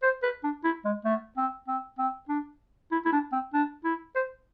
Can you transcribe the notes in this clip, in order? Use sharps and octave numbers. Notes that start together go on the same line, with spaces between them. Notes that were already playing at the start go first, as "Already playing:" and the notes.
C5
B4
D4
E4
G#3
A3
C4
C4
C4
D4
E4
E4
D4
C4
D4
E4
C5